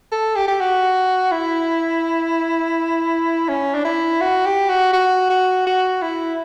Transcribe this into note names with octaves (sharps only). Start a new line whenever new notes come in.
A4
G4
G4
F#4
E4
C#4
D4
E4
F#4
G4
F#4
F#4
F#4
F#4
E4